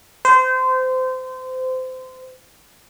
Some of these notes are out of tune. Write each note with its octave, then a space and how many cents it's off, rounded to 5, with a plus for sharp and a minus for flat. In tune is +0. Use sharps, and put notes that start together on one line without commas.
C5 -25